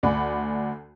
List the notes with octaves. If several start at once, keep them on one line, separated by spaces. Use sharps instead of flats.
D2 D5 F#5 G#5 B5